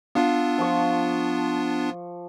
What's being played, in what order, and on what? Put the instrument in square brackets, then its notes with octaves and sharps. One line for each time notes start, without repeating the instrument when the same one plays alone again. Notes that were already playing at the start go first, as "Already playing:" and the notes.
[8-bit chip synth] B3 D4 F4 [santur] F5 E6
[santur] F3 C#6